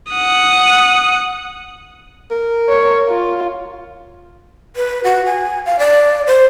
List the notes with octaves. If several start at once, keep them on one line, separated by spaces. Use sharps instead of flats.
F#5 D#6
A#4
C#5
F4
B4
F#4
G#5
F5
D5
C5